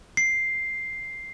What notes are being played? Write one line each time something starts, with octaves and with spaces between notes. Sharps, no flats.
C7